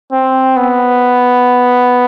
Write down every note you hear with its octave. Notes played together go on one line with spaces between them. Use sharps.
C4
B3